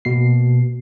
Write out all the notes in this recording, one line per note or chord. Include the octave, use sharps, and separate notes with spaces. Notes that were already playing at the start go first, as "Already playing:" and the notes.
B2 A#3 C7